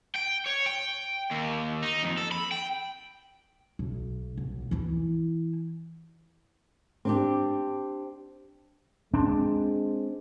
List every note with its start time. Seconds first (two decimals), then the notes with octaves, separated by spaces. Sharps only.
0.16 G5
0.47 C#5
0.67 G5
1.31 D#2
1.83 D#4
2.03 F2
2.18 A4
2.32 B5
2.51 G5
3.79 B1
4.37 B1
4.71 E3 E4
7.05 C4 D4 G4
9.14 G#3 C4 D4